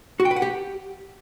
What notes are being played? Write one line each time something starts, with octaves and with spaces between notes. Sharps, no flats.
F#4
G5
B4
F#5
G4